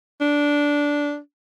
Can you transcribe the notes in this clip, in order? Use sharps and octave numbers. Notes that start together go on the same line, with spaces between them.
D4